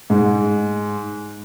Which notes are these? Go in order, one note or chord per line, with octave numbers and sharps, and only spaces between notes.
G#2